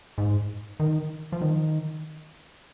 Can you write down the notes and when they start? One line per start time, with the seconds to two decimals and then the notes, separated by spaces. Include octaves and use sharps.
0.18 G#2
0.80 D#3
1.32 F3
1.42 D#3